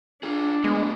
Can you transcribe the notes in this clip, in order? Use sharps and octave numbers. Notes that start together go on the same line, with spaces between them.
D4 F4 G#4
A2 G#3 B3